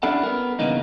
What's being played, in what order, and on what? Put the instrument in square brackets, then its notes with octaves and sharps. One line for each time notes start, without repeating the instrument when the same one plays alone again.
[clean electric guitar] G3 C#4 D4 E4 A4 F#5
B3 A#4
G2 C#3 E3 A#3 B3 D#4